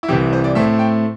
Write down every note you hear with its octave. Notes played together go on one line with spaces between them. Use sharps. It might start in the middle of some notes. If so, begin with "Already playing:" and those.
E4
C2 C3 E3 G4
C5
D5
A2 A3 C4 E5
G5